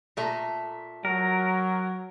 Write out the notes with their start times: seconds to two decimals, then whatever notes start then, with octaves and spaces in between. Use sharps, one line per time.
0.17 A#2 A3 A#5
1.05 F#3 A#4